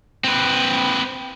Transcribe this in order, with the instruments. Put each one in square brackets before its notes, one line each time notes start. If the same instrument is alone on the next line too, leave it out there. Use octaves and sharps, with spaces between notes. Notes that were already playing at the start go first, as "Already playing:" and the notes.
[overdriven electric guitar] C4 B4